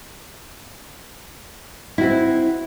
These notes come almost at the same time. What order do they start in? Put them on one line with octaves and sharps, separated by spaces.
E4 F#4 C4